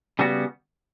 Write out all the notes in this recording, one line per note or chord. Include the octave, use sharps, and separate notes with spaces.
C#3 G3 B3 F#4